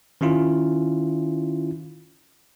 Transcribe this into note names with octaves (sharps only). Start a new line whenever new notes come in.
D#3 C#4 E4 F4